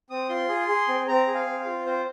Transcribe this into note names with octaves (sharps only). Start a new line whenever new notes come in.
C4 D#6
F4 C6
G#4
G#4
C4
C4 A#5
G#4
F5
C4
F5
F4
C4 C5